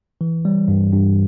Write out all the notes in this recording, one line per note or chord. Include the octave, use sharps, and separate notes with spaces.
E3
G3
G2
G2